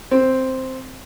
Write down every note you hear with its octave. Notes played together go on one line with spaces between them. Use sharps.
C4